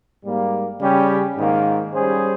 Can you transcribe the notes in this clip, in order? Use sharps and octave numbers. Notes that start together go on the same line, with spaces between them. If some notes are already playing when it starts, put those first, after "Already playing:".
G#2 G3 A#3
C#3 G3 C#4 G4
G#2 D#3 A#3
G3 C#4 G#4 C5